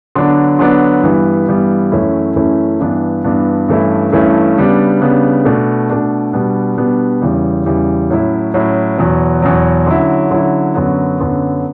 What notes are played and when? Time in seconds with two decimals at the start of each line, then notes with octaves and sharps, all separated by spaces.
0.15 D3 F#3 B3 D4
0.59 D3 F#3 B3 D4
1.03 G2 E3 G3 B3
1.48 G2 E3 G3 B3
1.92 F#2 E3 A3 C#4 E4
2.36 F#2 E3 A3 C#4 E4
2.80 G2 E3 B3 D4
3.24 G2 E3 B3 D4
3.68 G2 E3 A3 C#4 E4
4.12 G2 E3 A3 C#4 E4
4.57 C#3 G3 B3 D4
5.01 C#3 G3 B3 D4
5.45 B2 A3 D4
5.90 B2 A3 D4
6.33 B2 G3 B3 D4
6.77 B2 G3 B3 D4
7.21 E2 C#3 E3 G3
7.66 E2 C#3 E3 G3
8.10 A2 F#3 C#4 E4
8.54 A2 F#3 C#4 E4
8.98 E2 B2 F#3
9.42 E2 B2 F#3
9.86 D3 F#3 C#4 E4
10.31 D3 F#3 C#4 E4
10.75 F#2 D3 F#3 B3
11.19 F#2 D3 F#3 B3